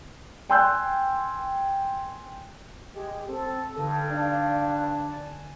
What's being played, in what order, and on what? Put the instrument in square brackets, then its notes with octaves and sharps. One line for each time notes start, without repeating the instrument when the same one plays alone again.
[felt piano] G5 G#5 C6 E6 F#6 G6
[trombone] G#3 [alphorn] G4
[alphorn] C4 [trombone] A4
[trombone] G2 [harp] D3 D#4 [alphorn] A4
[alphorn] D4 [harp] G4 F5
[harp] F#6 G#6
G#5 A5